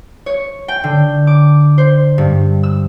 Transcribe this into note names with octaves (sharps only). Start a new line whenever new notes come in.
C#5
G5
D3
D6
C5
G2
E6